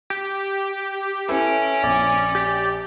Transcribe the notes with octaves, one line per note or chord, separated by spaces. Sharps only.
G4
C#4 E4 A4 B4 D7
A#1 D5
G4